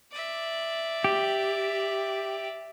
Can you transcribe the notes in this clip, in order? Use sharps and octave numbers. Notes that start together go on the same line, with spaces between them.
D5 E5
G4